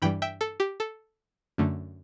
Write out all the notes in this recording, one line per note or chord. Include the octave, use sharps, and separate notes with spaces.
G2 E3 G3 G5 B5
E5 G5
A4
G4
A4
F#2 D3 A3